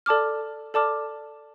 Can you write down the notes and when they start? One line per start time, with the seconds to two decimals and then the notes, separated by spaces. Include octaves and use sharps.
0.06 A4 D5 A5 D6 F6
0.74 A4 D5 A5 D6 F6